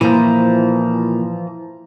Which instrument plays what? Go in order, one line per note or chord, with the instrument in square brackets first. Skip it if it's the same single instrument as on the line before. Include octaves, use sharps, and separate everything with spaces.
[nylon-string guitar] A#2 [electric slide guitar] E3 F3 [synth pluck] E4 C5 A#5